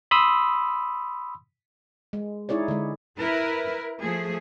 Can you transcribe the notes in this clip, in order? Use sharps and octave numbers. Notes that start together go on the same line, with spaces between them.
B5 C6 D#6 E6
G#3
D#4 E4 G#4 C#5 D5
D3 G#3
E4 A#4 B4
F3 A3 G#4